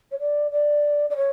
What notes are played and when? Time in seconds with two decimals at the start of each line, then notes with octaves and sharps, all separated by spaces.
0.11 C#5
0.19 D5
0.51 D5
1.09 D5
1.16 C#5